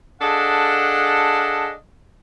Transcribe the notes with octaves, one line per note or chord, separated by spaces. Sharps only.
D4 G#4 A4 D#5 F5 F#5